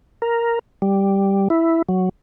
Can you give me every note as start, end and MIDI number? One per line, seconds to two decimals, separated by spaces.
0.22 0.59 70
0.82 1.48 55
1.50 1.82 64
1.89 2.09 54